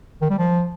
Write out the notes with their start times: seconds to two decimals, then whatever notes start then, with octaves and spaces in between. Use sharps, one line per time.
0.22 D#3
0.30 G3
0.38 F3